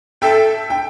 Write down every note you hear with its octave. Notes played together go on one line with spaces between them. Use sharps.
A4 E5 G5
G5